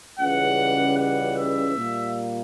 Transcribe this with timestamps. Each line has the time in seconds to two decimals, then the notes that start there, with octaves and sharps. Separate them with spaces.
0.20 C#2 C#3 E3 G3 F#5
0.98 F#5
1.37 E5
1.76 A#2 G3 A#3